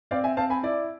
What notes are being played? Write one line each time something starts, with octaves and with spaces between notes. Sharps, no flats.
C4 D5 F5
E5 G#5
C4 F5 A5
G#5 B5
E4 D5